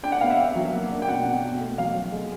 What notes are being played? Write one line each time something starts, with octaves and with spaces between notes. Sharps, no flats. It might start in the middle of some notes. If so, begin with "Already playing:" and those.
D4 G5
F#5
B3 F5
E5
D4 F5
F#3
A#3
D4
G5
B2 F#5
B2
B2
A3
F#3 F5
F#3
G#3